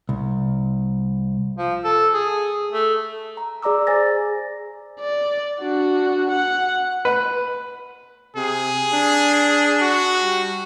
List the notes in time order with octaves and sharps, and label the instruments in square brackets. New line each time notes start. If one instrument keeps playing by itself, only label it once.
[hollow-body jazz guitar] C2
[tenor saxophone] F3
A4
G#4
A3
[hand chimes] A#5
G#4 D5 A#5 D6 E6
G#4 C5 G#5 A6 A#6
[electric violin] D5
D4 F#4
F#5
[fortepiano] B4
[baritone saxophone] C3 [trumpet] G#4
[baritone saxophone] D4
[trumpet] F#4
[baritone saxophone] G3